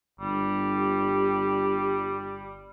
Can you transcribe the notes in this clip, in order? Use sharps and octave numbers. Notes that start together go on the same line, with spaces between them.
G1 G3
G4